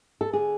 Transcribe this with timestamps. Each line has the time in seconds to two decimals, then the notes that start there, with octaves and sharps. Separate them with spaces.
0.21 A4
0.33 D3 G#4